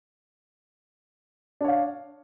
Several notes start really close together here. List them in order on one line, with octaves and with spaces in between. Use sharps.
D4 C#5 F5